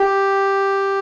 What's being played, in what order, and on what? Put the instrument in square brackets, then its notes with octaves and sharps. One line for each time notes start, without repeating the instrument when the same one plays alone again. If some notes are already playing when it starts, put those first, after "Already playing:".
Already playing: [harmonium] G4